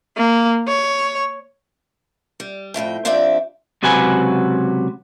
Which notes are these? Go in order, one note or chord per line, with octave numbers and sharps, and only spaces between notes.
A#3
C#5
G3
F2 A2 A3 G5
F2 C4 D4 G4 D5 E5
C#2 C3 F#3 F#4 B4 G#5